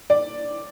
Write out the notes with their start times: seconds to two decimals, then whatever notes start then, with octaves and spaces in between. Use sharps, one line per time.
0.10 D5